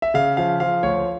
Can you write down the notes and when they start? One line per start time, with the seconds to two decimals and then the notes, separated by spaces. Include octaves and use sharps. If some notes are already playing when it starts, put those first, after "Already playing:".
0.02 E5
0.14 C#3 F5
0.37 F3 F5
0.60 F3 F5
0.83 D2 C#5